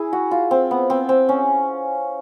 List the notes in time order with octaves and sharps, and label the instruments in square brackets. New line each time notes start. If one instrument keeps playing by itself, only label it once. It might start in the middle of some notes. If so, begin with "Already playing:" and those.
Already playing: [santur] E4 G#4
F#4
F4
C4
B3
C4
C4
C#4